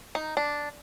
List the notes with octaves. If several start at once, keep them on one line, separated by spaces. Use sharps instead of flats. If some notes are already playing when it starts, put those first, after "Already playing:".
D#4
D4